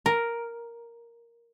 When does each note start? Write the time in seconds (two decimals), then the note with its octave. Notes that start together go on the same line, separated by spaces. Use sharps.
0.06 A#4